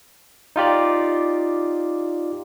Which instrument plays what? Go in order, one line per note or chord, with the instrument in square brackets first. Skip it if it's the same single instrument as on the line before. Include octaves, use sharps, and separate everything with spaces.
[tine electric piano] D#4 F4 G4 D5